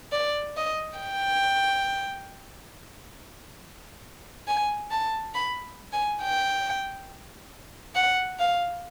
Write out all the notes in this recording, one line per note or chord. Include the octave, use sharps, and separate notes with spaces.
D5
D#5
G5
G#5
A5
B5
G#5
G5
F#5
F5